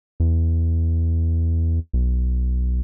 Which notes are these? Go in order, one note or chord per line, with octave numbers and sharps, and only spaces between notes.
E2
B1